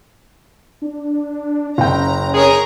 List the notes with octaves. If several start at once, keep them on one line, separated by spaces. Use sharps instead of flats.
D4
F#1 C#4 G5 A#5
G#4 A#4 C#5 A#5